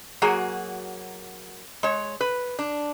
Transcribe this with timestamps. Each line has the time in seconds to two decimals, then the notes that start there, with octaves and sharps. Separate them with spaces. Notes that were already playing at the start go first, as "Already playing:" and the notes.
0.22 F#3 A#3 F#4 G#4
1.83 G#3 C#5
2.21 B4
2.59 D4